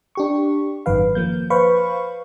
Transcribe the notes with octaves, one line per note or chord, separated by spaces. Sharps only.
D4 G4 C#6
G#1 F#2 D#3 B4 F5
F3 A#3 G6
B4 C5 F5 B5 C#6